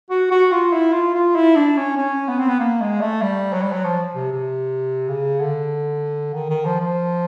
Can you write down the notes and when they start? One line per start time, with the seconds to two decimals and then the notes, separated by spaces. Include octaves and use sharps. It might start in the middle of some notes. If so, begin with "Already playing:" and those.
0.10 F#4
0.31 F#4
0.52 F4
0.73 E4
0.93 F4
1.14 F4
1.36 E4
1.56 D4
1.77 C#4
1.97 C#4
2.29 B3
2.39 C4
2.48 B3
2.60 A#3
2.81 G#3
3.01 A3
3.22 G3
3.53 F#3
3.63 G3
3.72 F#3
3.84 F3
4.15 C3
4.32 C3
5.09 C#3
5.40 D3
6.34 D#3
6.50 D#3
6.65 F3
6.80 F3